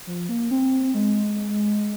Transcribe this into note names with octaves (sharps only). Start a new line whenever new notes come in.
F3
A#3
C4
G#3